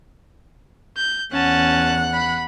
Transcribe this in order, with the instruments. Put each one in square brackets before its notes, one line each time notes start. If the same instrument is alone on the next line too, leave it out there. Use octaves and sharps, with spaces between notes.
[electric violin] G6
[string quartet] E2 F#5 F#6 [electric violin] C#4 A5
[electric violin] B5